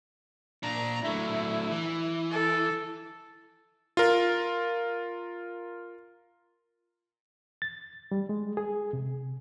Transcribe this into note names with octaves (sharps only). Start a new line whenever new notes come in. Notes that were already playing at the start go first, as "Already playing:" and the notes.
A#2 D4 A#5
F#3 A3 E4
E3
A4
F4 A#4
A6
G3
G#3
G#4
C3